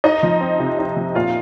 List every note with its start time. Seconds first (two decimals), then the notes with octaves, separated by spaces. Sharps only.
0.04 D#4 D#5
0.23 F3
0.41 C4
0.59 C3
0.79 D#4
0.96 F3
1.15 A#2 F4 F5